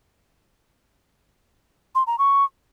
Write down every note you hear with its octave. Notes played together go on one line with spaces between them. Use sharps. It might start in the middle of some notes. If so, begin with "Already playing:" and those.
C6
A#5
C#6